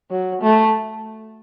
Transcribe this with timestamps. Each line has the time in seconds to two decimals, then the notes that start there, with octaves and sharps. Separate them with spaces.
0.11 F#3
0.42 A3